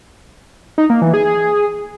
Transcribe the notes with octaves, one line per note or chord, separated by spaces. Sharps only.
D#4
A#3
E3
G#4